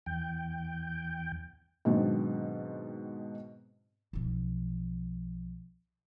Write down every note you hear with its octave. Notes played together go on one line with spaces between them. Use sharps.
E2 G5
G#2 B2 D#3 F#3 C4 D4
B1 F3